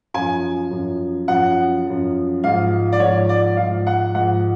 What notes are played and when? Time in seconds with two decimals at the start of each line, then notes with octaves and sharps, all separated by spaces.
0.14 F#2 F3 G#5
0.71 F#2 F3
1.28 F#2 F3 F#5
1.85 F#2 F3
2.44 G#2 F3 F5
2.92 D5
3.00 G#2 C#5
3.04 F3
3.29 D5
3.57 G#2 F3 F5
3.87 F#5
4.15 G#2 F3 F#5